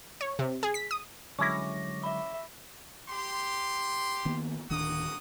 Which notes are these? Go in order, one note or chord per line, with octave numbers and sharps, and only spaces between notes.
C#5
C3
G#4
B6
D#6
D3 F#3 G#3 C#4 E4 C#6 D6 A#6
E5 B5
G4 C6
D#3 A#3 B3
D1 D#3 A#3 D4 F#4 D#6